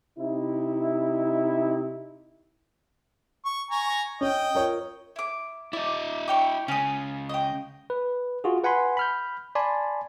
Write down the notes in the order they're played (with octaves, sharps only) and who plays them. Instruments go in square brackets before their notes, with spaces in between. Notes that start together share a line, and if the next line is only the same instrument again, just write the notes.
[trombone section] C3 D#4 E4
[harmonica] C#6
G#5 A#5 C#6
[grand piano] C#4 [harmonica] D#5 G5
[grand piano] F4 A#4 C#5
[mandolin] E4 D6
[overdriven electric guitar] E4 D#5 [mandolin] D5
[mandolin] C#5 G5 D6
[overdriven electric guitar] C#2 C#3 [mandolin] C#4 D#6
[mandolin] D#5 G5
[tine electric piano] B4
F4 F#4 G#4
B4 F#5 G#5 B5 C6
B5 F6 G6
D5 G#5 A5 B5 C6